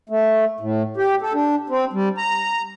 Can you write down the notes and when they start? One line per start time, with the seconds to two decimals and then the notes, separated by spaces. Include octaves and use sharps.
0.09 A3
0.60 A2
0.97 G4
1.22 A4
1.34 D4
1.70 C4
1.93 G3
2.18 A#5